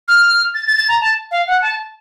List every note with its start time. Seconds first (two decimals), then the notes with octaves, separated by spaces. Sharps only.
0.08 F6
0.54 A6
0.67 A6
0.77 A6
0.89 A#5
1.01 A5
1.31 F5
1.47 F#5
1.62 A5